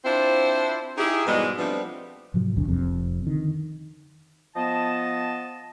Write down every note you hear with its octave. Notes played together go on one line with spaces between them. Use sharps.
C4 D4 E4 F4 C5
D#4 E4 G4 G#4
G#2 B2 E3 G3 G#3
F3 G3 A3 B3 C4 D4
G#2 C3 F3 F#3
A#1 E2 D3
F1 F2 C3
D3 D#3
F3 B3 D#5 A5